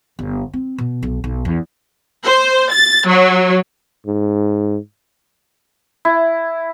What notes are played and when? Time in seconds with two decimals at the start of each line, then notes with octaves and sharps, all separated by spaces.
0.19 G1
0.53 C4
0.78 B2
1.03 B1
1.24 B1
1.45 E2
2.26 C5
2.71 A6
3.07 F#3
4.07 G#2
6.05 E4